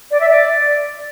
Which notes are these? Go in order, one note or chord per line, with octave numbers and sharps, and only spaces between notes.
D5
E5
D5